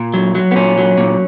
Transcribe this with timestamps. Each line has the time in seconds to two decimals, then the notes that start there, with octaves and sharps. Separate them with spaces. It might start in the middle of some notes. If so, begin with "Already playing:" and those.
Already playing: A#2
0.14 F#3
0.35 F#3
0.51 B3
0.56 A#2 C#4
0.78 F#3
0.98 A#2